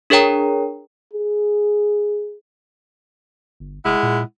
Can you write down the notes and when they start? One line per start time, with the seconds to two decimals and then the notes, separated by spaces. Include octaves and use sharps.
0.10 D4 G#4 A#4 C#5 G5 A#5
1.13 G#4
3.60 G1
3.85 F1 G#3 E4 F#5
4.03 A#2